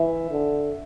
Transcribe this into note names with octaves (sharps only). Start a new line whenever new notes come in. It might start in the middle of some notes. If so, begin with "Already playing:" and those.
Already playing: E3 E5
D3